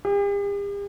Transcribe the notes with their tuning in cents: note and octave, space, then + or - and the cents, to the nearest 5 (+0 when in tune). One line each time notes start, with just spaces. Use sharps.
G4 +45